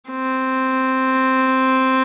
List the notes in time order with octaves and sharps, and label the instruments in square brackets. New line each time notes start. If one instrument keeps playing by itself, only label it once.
[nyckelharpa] C4